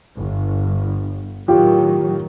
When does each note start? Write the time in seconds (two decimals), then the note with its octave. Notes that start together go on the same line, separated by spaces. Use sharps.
0.15 G1
1.48 A2 D#3 F#3 F4 G4